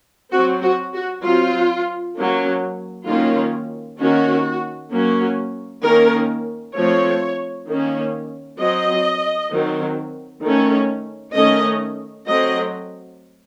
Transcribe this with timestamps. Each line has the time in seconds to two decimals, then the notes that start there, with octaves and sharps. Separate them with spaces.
0.32 F#3 C4 F#4
0.62 F#4
0.94 F#4
1.23 F#3 C4 F4
2.16 F#3 A#3 C#4
3.07 D#3 F#3 A#3 C#4 F4
3.99 D#3 A#3 C#4 F#4
4.92 F#3 A#3 C#4
5.83 D#3 A#3 C#4 A#4
6.75 F3 A3 C4 C#5
7.67 D#3 A#3 C#4
8.58 F#3 C4 D#5
9.50 D#3 F#3 C4
10.42 D#3 A3 C#4
11.34 D#3 A3 C#4 D#5
12.27 F#3 A3 C4 D#5